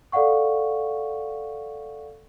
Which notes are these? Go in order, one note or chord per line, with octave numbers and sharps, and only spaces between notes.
A4 D5 F5 F#5 C#6